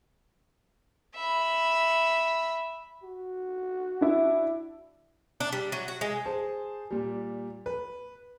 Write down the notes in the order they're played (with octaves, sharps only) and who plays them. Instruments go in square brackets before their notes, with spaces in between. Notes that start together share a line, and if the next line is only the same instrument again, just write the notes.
[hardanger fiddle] E5 B5
[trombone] F#4
[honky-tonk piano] D4 E4
[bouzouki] D4
G3
F#3
F#4
G#3
[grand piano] G#4 C5 A5
A#2 G3
B4